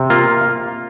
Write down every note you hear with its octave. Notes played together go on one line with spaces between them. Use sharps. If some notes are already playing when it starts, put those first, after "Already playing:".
Already playing: C3
A#3 F4